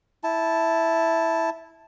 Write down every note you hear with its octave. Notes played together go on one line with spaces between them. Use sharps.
E4 A5